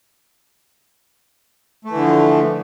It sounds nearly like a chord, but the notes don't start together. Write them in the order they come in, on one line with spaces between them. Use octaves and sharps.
A3 E3 D3 F3